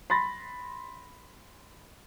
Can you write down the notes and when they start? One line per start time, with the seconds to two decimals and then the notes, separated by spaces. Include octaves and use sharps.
0.10 B5 C6 A6 A#6